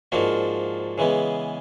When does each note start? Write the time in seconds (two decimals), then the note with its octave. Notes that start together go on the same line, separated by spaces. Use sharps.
0.12 G#2 F3 A#3 D4 F#4
0.98 C#3 E3 G#3 B3